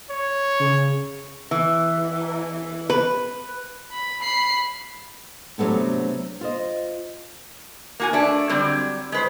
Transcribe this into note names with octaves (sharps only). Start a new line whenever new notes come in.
C#5
C#3
E3
B4
B5
B5 C7
C3 F#3 G#3 A3 B3 D4
F4 C5 D#5
A#3 F#4 G#5
A3 D4
D3 F#3 G3 C4
G#3 B4 C5